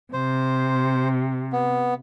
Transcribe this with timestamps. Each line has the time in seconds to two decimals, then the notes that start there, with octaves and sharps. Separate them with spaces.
0.13 C3 C5
1.53 B3